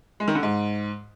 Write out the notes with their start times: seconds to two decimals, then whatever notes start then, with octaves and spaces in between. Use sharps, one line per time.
0.20 G#3
0.28 D#3
0.35 D3
0.43 G#2